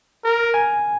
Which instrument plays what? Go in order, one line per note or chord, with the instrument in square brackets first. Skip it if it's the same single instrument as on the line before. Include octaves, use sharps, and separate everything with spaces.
[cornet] A#4
[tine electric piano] G#5